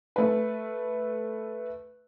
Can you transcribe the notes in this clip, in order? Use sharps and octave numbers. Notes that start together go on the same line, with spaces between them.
A3 B4